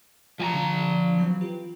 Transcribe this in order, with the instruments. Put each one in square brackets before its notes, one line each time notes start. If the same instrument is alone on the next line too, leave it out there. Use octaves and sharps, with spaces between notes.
[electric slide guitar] F3 G#5 A#5
[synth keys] D3 D4
E3 F#3 C4
F4 G4 B4